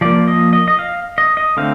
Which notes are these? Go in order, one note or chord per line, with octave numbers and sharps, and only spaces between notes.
F3 A#3 D5
D#5
D#5
D#5
F5
D#5
D#5
D3 A3 C4 F5